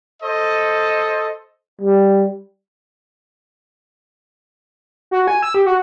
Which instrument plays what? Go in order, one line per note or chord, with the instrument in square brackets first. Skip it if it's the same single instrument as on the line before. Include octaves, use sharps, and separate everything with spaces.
[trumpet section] A4 C5 D#5
[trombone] G3
[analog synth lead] F#4
G#5
E6
G4
F#4